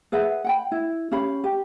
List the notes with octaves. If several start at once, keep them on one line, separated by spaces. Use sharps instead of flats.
G#4 B4 E5 F#5
F#5 G5 B5
E4
C#4 G4 F5 B5
G4